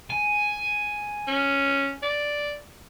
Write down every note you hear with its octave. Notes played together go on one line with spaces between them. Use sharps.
G#5
C#4
D5